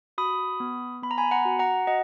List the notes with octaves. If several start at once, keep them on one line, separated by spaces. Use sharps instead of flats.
F#4 B5 D#6
B3
B3 B5
A#5
G#5 B5
F#5 A#5
F#4
F#5 A#5
F#4 D#5 F#5